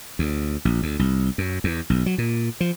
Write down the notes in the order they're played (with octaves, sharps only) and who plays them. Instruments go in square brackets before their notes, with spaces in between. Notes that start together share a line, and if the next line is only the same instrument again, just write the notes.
[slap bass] D2
A#1
D2
C2
F#2
E2
B1
F#3
A#2
F3